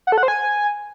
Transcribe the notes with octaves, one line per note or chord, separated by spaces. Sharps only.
F#5
A4
F#5
C5
G#5